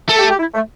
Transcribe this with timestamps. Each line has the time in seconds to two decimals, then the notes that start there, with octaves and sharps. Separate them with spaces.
0.09 A3 A4
0.19 G4
0.30 G4
0.39 E4
0.54 A3